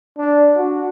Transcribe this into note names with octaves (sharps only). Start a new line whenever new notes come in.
D4
F#4